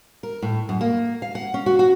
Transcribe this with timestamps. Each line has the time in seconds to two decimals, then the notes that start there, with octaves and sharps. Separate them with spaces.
0.23 A#4
0.42 A2
0.69 F#2
0.81 A#3
1.22 F5
1.35 F#5
1.54 C#4
1.66 F#4
1.79 F#4